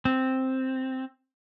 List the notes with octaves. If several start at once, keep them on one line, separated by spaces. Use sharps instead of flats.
C4